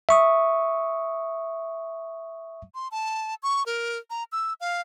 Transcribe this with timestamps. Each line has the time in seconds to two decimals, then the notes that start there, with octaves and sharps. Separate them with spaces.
0.09 E5 C#6 D#6
2.75 C6
2.91 A5
3.43 C#6
3.66 A#4
4.10 A#5
4.32 E6
4.60 F5